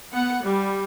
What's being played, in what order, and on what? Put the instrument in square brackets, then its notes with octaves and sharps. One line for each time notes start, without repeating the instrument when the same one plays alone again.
[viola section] B3 F#5
G3